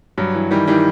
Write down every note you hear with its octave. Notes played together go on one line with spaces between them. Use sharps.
G2 F#3
E3
D#3 E3 G3
D#3 E3 G3